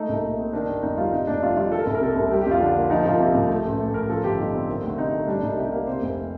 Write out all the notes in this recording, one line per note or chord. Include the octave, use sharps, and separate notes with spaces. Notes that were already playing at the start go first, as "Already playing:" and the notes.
Already playing: A3 D#4
C2
A#2
C4
D#3 D4
G1
F2 D#4
G3 F4
C3 D#4
F1 D4
F2 F4
G3 F4
D#3 A4
A#4
C2 A4
A#4
C3 A4
C2
G3 G4
G4
F2
F4
D3 D4
A#3
F3 D#4
C2 F4
C3 G4
C2
A3
A1
A2 A4
A1 A#4
F3 A4
G1 G4
G2 D#4
C4
D#3
D2
C3 D#4
A3
G3 D4
C2 D#4
C3 G4
A#3
C3 C5
F1